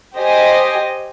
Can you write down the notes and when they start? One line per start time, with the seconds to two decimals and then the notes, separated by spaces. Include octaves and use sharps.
0.16 G4 C5 D#5 G#5